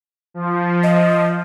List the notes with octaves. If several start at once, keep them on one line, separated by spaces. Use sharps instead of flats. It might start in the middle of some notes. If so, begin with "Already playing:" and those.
F3
D#5